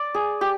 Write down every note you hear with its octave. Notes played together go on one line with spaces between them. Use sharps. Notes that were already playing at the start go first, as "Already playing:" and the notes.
Already playing: D5
G#4
G4